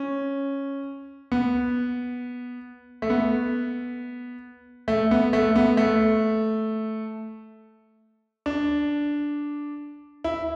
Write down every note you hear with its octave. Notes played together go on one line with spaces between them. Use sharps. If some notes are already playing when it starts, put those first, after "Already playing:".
Already playing: C#4
B3
A3
B3
A3
B3
A3
B3
A3
D4
E4